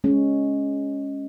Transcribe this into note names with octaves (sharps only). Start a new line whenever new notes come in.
G#3 C#4